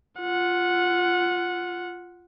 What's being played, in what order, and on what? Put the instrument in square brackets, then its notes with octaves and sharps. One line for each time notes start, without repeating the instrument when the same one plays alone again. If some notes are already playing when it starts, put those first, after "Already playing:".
[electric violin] F4 F#5